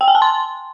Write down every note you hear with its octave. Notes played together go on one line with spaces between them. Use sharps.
G5
G#5
A5
C6